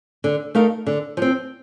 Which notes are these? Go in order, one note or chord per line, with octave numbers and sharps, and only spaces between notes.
D3
A3 D#4 A#4 F5
D3
F3 C4